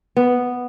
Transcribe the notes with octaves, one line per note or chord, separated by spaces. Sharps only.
B3